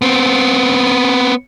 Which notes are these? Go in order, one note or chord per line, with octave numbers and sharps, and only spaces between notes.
B3 C4